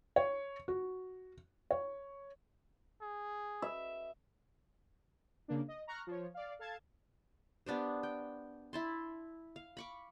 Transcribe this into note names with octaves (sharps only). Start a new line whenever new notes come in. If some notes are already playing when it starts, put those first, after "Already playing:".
C#5
F#4
C#5
G#4
E5
C#3 A#3 D4
D#5
A#5 C#6 F6 F#6
F3 C#5
D5 F5
A4 F5 A5 G#6
B3 D4 G4 C5
G5
E4 A5 C6
F5
B5 C#6 D6